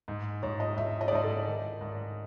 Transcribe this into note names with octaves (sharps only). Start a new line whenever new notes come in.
G#2
G#2 C#5
D#5
G#2 E5
D#5
D5
G#2 D#5
A4
D#3
G#2